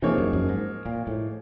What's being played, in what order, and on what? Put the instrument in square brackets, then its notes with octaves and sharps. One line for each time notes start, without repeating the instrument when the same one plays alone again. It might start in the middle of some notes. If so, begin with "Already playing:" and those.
[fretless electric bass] C3 [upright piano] F3 A#3 D#4 G#4 C#5
[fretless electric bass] F#2
F#2
G#2
A#2
A2